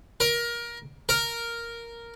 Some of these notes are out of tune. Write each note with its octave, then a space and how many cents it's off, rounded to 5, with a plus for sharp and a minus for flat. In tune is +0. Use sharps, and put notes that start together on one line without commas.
A#4 +20
A#4 +0